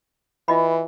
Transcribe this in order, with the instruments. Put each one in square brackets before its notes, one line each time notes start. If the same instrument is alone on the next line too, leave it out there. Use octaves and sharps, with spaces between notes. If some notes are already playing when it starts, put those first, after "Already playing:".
[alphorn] E3 [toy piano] F4 D#5 B5